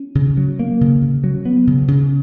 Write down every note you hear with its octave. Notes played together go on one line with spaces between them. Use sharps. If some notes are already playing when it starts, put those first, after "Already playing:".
Already playing: C#4
C#3
F#3
A#3
C#3
C#3
F#3
B3
C#3
C#3